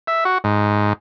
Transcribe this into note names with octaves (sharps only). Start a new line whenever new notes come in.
E5
F#4
G#2